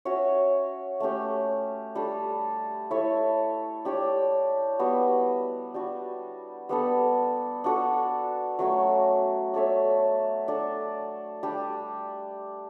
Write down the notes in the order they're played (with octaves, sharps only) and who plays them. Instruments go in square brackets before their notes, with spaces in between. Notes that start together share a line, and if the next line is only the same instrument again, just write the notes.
[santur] C#4 F#4 C#5 E5
A3 C#4 G4
G3 D4 A4
E4 A4 C#5 E5
D4 G4 C#5
G3 B3 F#4
G3 D4 F#4
G3 B3 D4 A4
D4 F#4 A4
F#3 A3 C#4 F#4
D4 A4 C#5 E5
D4 A4 D5
G3 D4 G4